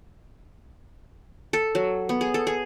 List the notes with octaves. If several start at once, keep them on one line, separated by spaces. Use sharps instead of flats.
A4
F#3
B3
G#4
A4
G#4